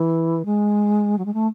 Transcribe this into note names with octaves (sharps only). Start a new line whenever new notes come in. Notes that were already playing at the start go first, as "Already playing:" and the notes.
Already playing: E3
G#3
F#3
G#3
A3